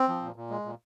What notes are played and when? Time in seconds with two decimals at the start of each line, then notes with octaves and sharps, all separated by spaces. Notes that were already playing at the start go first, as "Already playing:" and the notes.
Already playing: C4
0.08 F3
0.22 A#2
0.36 A#2
0.50 G#3
0.65 A#2